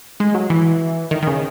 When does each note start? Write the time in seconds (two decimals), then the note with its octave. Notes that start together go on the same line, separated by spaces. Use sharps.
0.20 G#3
0.35 F#3
0.50 E3
1.11 D#3
1.22 D#3
1.27 C#3